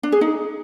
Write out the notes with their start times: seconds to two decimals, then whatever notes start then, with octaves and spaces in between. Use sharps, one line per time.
0.03 D4
0.12 G#4
0.21 D#4